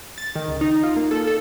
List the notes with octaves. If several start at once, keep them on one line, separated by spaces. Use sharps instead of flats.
A6
D#3
C#2
D#4
F4
A#3
A4
A4